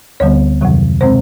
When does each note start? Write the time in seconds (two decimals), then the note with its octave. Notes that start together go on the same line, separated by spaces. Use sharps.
0.20 D2 D3 G3 B3 C#5
0.61 F2 C3 D#3 F#3
1.01 B2 G#3 C4 C5